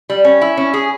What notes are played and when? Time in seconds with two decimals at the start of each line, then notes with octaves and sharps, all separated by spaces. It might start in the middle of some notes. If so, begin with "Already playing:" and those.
0.10 G3
0.25 C#4
0.41 E4
0.57 C#4
0.74 G#4